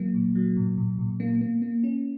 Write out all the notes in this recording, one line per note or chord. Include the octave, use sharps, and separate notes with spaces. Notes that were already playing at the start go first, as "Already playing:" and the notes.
Already playing: F#3 A#3
A#2
F#3
A#2
A#2
A#2
A#3
A#3
A#3
C#4